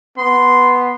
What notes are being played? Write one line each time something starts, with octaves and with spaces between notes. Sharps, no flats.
B3 C6